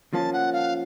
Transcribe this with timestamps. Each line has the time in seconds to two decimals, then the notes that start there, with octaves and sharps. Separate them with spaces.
0.13 F3 A#3 C#4 A5
0.33 F#5
0.53 F5